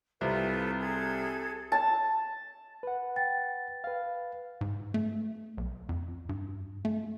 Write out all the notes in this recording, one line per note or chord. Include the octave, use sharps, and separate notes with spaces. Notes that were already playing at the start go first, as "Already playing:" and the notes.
C2 C3 F4 A4 B4
G#4 A4 G#6
A5
B4 F#5
G5 A6
B4 F5
G#2
A3
B1
F2
G2
A3